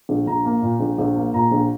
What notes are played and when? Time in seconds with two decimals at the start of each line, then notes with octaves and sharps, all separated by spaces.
0.09 A#1
0.27 A#1 A#5
0.45 A#3
0.62 A#2
0.80 A#1
0.98 A#1
1.16 A#3
1.34 A#2 A#5
1.51 A#1